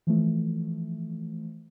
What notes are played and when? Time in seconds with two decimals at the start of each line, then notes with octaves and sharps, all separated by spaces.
0.07 E3 F3 A3